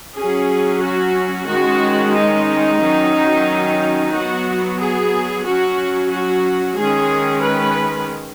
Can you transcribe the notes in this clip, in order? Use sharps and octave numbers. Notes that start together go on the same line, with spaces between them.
F#3 C#4 G#4
F#4
D#3 G#3 C#4 F#4
D#4
D#3 F#3 C#4
F#3 B3 F#4
G#4
F#3 C#4 F#4
F#4
D#3 G#3 C#4 G#4
B4